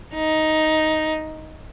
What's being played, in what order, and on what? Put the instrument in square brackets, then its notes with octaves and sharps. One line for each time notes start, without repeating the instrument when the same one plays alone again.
[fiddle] D#4